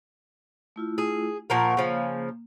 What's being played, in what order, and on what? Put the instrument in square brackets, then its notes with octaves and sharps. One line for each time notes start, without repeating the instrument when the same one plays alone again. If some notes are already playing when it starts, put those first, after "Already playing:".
[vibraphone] A3 E4 F4
[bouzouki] G#4
[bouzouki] A#2 F3 A#4 [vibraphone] F#5 C#6
[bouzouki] C#3 F3 [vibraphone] A#3